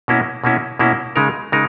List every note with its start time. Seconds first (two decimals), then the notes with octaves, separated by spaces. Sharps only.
0.08 B2 A#3 C#4 E4
0.44 B2 A#3 C#4 E4
0.79 B2 A#3 C#4 E4
1.16 C#3 G#3 D#4 A#4
1.52 C#3 G#3 D#4 A#4